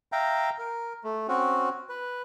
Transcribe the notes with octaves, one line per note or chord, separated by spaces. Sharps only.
E5 F5 G5 A#5
A#4
A3
C4 C#4 F#4
B4